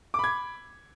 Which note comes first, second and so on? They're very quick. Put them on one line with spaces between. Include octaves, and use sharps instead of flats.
D6 B5 G#6